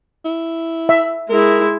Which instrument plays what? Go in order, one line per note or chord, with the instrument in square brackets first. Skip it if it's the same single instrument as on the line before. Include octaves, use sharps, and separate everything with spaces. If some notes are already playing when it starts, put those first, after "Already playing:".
[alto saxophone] E4
[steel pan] E5
[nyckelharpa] G#3 E4 [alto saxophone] A#4